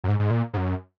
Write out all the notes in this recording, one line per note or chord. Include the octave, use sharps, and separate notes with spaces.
F#2
G#2
G#2
A#2
G#2
F#2